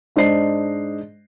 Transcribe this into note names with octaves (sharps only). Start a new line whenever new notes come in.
G#2 D4 C5 D#5 C7